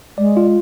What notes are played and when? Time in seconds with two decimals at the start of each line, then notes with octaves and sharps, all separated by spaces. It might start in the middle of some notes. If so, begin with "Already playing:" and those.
0.18 G#3 D5
0.37 F4